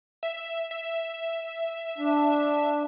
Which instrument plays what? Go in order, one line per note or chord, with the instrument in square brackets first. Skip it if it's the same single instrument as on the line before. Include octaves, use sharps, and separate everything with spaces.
[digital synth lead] E5
E5
[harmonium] D4